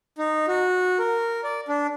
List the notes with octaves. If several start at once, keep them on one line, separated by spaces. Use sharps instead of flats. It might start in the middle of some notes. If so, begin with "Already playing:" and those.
D#4
F#4
A#4
D5
D4